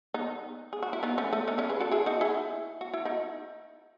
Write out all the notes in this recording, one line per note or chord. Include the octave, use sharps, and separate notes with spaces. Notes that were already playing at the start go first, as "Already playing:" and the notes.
B3 D#4
G#4
F#4
E4
B3 D#4
A3 C#4
A3 C#4
B3 D#4
C#4 E4
G#4 B4
F#4 A4
E4 G#4
D#4 F#4
E4 G#4
F#4
E4
D#4 F#4